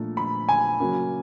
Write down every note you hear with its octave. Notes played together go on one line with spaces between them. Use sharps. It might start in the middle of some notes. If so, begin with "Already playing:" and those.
Already playing: A#2 F3 A3 D4 F4
B5
G#5
C#3 F#3 A#3 C#4